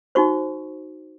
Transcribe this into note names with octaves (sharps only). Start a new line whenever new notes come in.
D#4 F#4 C5 C#6